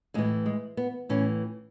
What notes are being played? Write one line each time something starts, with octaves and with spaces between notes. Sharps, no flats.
A2 E3 G#3
G#3
B3
A2 E3 C#4